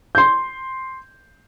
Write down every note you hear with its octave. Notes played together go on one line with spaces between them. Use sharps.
C6 G6